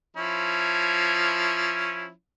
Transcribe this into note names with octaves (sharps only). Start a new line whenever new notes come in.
F3 C#4 E4